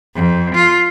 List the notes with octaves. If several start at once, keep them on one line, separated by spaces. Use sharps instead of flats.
F2
F4